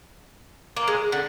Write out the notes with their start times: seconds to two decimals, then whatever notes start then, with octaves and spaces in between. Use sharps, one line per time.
0.77 A#3
0.88 G#3
1.12 D3